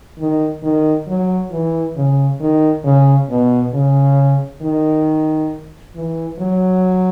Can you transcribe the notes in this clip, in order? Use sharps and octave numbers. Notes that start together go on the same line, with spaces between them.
D#3
D#3
F#3
E3
C#3
D#3
C#3
B2
C#3
D#3
E3
F#3